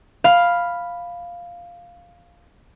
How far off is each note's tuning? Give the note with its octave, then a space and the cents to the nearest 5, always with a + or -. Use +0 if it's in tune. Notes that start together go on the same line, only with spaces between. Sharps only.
F5 +0 B5 +0